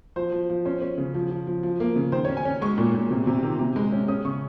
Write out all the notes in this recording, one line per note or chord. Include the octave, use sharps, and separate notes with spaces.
F3 C5
F3
F3
C#4 C5
C#4
C#3
F3
F3
F3
F3
A#3
C#3
D#3 C5
C#5
C#4
G#5
C#4
G#3 C#6
A#2
A#2
C3
C3
D#3
C3
G#3
C#4
C#4 D#6
C#3 C#6